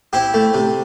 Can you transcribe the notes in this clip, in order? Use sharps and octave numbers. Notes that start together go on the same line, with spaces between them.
C4 E4 G4
A3
C3